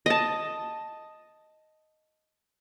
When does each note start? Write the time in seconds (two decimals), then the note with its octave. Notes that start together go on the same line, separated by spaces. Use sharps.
0.06 D#5 A5